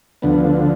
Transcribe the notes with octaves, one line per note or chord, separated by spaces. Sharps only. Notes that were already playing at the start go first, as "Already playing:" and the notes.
D2 D3 F3 B3